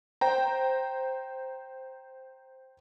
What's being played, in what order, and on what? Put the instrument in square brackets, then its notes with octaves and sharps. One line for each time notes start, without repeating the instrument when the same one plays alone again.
[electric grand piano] C5 G5 A#5